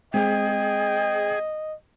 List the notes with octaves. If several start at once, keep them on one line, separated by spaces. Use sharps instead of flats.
G#3 C4 G#4 D#5 G5